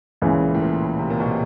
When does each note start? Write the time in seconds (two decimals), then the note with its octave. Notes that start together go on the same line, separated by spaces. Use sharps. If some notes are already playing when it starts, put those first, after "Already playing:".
0.22 C#2 A#2 C#3 E3
0.54 A2
0.60 A#2
0.99 C3
1.10 A#2
1.20 B2
1.28 C3